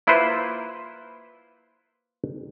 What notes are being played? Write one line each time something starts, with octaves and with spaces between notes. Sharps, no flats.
A#3 E4 F4 B4 C5